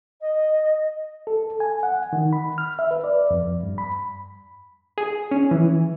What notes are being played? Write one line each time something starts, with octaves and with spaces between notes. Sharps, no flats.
D#5
A4
G#5
F#5
D#3
B5
F6
E5
B4
D5
F2
G2
B5
G#4
C#4
E3